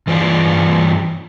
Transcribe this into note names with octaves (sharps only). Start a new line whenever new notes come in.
G2 E3 F4 C5 D5 F5